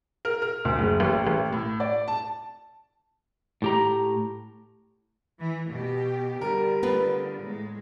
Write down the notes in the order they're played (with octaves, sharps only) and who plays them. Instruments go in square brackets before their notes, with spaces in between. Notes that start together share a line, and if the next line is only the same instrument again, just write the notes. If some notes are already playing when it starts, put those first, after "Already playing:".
[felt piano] A#4
A#4
D2
F#1
A1
A1
A2
D5
A5
[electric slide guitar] A2 G4 A#5
[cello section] E3
B2 G4
[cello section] D3 [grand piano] G3 A#4
[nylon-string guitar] B3 F4 B4
[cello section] A2 G#3